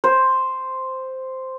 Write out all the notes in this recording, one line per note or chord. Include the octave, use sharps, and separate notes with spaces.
C5